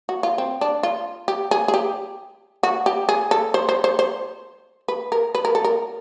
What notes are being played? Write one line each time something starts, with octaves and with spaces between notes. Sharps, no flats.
F#4
F4
C4
D4
F4
G4
G#4
G#4
G4
F#4
G4
G#4
A4
C5
C5
C5
C5
B4
A#4
B4
A#4
A4
A#4